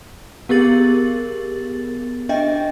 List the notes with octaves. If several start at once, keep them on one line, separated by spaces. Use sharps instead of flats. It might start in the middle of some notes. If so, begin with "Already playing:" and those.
B3 G4 G#4 A#4 A6 F#7
D4 D#5 E5 G5